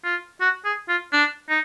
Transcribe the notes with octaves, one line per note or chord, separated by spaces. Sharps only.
F4
F#4
G#4
F4
D4
D#4